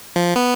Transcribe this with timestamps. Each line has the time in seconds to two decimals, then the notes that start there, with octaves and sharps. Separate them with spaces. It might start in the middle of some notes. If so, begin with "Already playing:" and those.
0.16 F3
0.36 B3